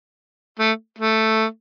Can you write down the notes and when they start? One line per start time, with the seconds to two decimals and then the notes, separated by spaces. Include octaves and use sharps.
0.59 A3
0.98 A3